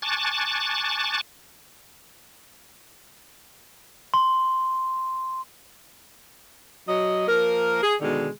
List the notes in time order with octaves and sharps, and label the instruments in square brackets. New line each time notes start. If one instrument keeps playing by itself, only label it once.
[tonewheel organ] G#5 A5 C#6 D6 F#6 A6
[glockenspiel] C6
[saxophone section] F#3 D#5
F3 A#3 A#4
G#4
B2 D3 D#3 G#3